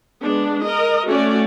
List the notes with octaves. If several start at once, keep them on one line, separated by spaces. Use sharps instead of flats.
G#3 B3 D4
A#4 D#5
A3 C#4 F#4 D5